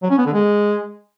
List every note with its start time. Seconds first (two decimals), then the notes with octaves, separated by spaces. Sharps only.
0.03 F#3
0.11 C#4
0.18 B3
0.26 D3
0.34 G#3